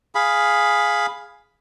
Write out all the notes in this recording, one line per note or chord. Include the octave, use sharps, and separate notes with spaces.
G#4 F5 B5